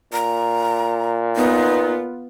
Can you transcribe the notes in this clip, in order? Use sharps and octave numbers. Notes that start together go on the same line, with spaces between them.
A#2 A#5
B3 D#4 F4